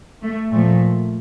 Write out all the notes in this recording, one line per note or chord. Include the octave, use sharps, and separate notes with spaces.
A3
A#2 F3 A3